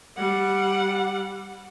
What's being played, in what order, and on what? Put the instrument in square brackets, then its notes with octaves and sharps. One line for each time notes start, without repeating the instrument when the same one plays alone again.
[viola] G3 F#5